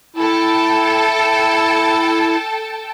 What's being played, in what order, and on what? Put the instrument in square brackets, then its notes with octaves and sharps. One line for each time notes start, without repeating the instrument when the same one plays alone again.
[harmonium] E4 [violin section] A4 G5 A5